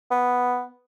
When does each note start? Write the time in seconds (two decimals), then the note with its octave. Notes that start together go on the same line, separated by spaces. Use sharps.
0.11 B3